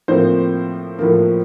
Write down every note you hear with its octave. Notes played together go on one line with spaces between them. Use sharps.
A2 F3 A#3 C4 C5
A2 F3 A#3